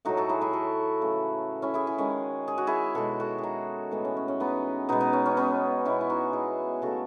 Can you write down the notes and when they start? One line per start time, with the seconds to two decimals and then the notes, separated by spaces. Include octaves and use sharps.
0.05 A2 F#3 A3 D#4 F#4
0.17 F#4 A4
0.29 E4 G#4
0.41 E4 G#4
0.53 F#4 A4
1.01 C#3 E3 A3
1.62 C#4 E4
1.74 E4 G#4
1.87 E4 G#4
1.98 D#3 G#3 C#4
2.48 G#4
2.58 F#4
2.67 E4 G#4
2.94 B2 G#3 F#4 A4
3.20 F#4 A4
3.38 G#4
3.43 D#4 F#4
3.91 A2 E3 G#3 B3
4.05 C#4
4.17 C#4
4.28 C#4
4.40 B3 D#4
4.89 B2 G#3 B3 D#4
5.01 B3
5.13 C#4
5.26 C#4
5.37 B3 D#4
5.85 B2 G#3 C#4 E4
6.01 E4
6.10 D#4 F#4
6.33 E4 G#4
6.82 C#3 F#3 A3 F#4 A4